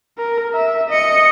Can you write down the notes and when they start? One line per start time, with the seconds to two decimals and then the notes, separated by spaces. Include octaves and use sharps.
0.18 A#4
0.54 E5
0.90 D#5 C#7